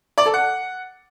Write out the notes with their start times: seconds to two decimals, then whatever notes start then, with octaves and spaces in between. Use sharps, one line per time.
0.18 D5
0.26 A4
0.34 F#5